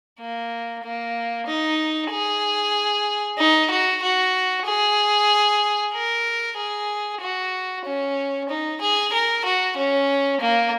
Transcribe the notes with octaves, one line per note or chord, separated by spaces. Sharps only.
A#3
A#3
D#4
G#4
D#4
F#4
F#4
G#4
A#4
G#4
F#4
C#4
D#4
G#4
A#4
F#4
C#4
A#3